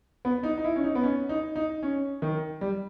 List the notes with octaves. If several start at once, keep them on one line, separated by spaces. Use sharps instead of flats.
B3
D#4
D#4
E4
C#4
D#4
B3
C#4
D#4
D#4
C#4
D#3
G3